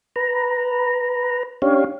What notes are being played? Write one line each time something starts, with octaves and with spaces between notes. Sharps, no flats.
B4 A#5
C#4 D4 G4 C#5 F5